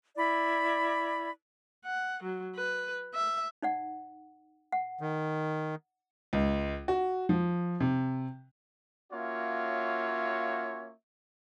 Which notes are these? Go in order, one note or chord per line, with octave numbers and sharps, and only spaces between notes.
E4 D5 B5
F#5
F#3
B4
E5
D#4 D5 F#5
F#5
D#3
C#2
F#4
F3
C3
A#3 C#4 F4 F#4 C#5 E5